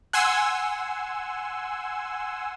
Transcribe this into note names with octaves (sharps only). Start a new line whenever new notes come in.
F#5 G#5 C6 E6